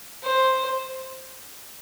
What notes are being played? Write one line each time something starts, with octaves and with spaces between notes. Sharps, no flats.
C5